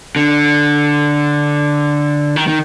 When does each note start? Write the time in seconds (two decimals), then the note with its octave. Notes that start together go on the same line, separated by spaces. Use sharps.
0.16 D3
2.36 D#3
2.47 D#3